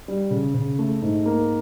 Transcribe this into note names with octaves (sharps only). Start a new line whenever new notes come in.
G3
C#3
C#3
A3
G#2
A#3